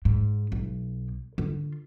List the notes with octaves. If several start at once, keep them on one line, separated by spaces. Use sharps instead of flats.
G#2
B1
D3 F4